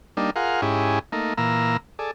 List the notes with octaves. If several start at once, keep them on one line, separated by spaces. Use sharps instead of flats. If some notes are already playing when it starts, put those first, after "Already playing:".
G3 A#3 D4 D#4
F4 G#4 A#4 F5 F#5
G#2 C#4 E4 G4 G#4
A3 A#3 D#4
A#2 E3 A#3 A#5 E6
G#4 A4 D5